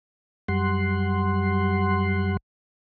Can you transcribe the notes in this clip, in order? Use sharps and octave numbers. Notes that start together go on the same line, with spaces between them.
F#2 G3 F#5 C6